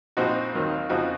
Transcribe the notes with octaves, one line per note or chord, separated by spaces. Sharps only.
A#1 A#2 F3 C4 D#4 F#4
D#2 D#3 F#3 C4
F2 C#3 F3 D#4 F#4